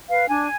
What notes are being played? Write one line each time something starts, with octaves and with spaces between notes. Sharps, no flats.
B4 F5
D4 G#5